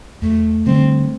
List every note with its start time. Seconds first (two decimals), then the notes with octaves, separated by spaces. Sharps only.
0.22 E2 A3
0.66 D3 G3 C4 D4